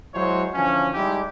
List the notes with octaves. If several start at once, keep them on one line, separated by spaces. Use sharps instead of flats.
F#3 G#3 E4 C5 C#5
D3 E3 F3 C#4
G3 G#3 D#4 E4 G4